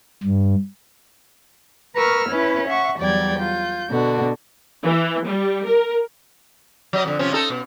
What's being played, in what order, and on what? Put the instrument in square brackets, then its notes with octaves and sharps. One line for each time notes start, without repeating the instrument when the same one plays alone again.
[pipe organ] G2
[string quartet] A#4 B4 C#6 E6 F6
C#4 E4 B4
E5 F#5 C#6
E2 F#3 G3 D5 G5 G#6
F4 G6
B2 D3 D4 F#4
[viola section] E3
G3
A#4
[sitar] F#3 D#5
F2 D3
C3 F3 C#4
D#4 A4
B2